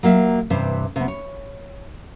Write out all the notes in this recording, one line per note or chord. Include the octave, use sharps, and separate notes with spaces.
F#3 A#3 F4 E5
G2 C3 E3 C5
C3 B3
C#5